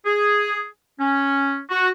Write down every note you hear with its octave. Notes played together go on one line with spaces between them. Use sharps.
G#4
C#4
F#4